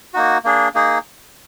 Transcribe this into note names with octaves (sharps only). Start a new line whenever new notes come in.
A#3 D#4 F#4
A#3 D4 G#4
A#3 D#4 G#4